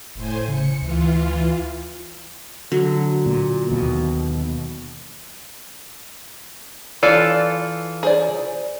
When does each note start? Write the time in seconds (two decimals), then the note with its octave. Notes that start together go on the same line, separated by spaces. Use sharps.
0.15 F1 A2 C5 G#5
0.48 C#3 C#7
0.81 D2 E3 F4
2.72 D3 F#3
3.26 A#2
3.70 D#2 B2
7.03 E3 F4 A4 D5
8.03 G#4 C5 D5